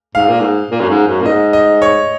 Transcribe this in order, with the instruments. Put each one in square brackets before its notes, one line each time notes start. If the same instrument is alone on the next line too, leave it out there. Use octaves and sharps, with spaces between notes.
[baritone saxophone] G#2 [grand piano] F5
[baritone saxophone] A#2
G#2
A#2
F#2
G#2
F#2
A#2
[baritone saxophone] G#2 [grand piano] D#5
[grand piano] D#5
C#5